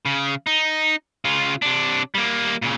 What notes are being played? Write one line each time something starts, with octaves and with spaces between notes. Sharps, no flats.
C#3
D#4
C#3 F4
C3 D4
G3 A#3
A#2 C#3